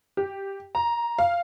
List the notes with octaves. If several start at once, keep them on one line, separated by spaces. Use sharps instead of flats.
G4
A#5
F5